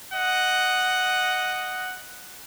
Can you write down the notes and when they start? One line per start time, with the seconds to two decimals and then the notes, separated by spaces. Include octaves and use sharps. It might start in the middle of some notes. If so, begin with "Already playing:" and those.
0.13 D#5 F#5